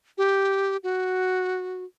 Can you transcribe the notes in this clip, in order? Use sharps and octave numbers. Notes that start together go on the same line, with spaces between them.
G4
F#4